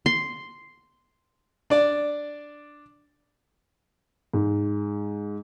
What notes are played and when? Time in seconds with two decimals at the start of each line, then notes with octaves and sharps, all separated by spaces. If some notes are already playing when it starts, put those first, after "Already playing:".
0.06 C6
1.70 D4 D5
4.34 G#2